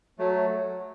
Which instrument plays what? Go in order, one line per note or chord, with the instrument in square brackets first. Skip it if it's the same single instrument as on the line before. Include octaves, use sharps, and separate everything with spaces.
[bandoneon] F#3 A3